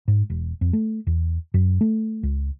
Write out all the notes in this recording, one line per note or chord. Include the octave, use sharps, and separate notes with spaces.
G#2
E1
F2
A3
E2
F#2
A3
C#2